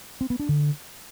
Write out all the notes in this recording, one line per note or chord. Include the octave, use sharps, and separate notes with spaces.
C4
B3
D4
D3